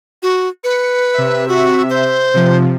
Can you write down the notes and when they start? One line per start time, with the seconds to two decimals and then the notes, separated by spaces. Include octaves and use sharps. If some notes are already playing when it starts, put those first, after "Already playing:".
0.23 F#4
0.64 B4 C#7
1.14 C3 E5
1.48 F#4
1.90 C5
2.34 C3 F3